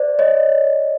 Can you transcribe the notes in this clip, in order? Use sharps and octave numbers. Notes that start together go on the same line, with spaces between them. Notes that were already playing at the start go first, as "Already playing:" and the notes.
Already playing: C5 D5
C#5 D#5